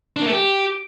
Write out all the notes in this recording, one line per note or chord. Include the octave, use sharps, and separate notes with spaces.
D4
A#3
A3
G4